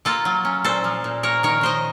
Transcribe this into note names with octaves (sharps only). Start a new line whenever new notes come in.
A#3 F4 A4
F#3
C#4
A#2 A4 C5
F3
A#2
A#3 A#4 C#5
D#3 A#4 C#5
D#3 C5 D#5